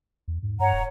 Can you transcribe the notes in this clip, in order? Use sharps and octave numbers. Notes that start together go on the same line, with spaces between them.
E2
G#2
G2 C#5 F#5 A#5
D#1